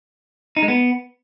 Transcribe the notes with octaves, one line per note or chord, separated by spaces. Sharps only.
D#4
G#3
B3